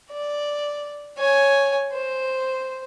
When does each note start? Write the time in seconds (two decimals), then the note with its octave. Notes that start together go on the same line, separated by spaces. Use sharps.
0.11 D5
1.18 C#5 G#5
1.92 C5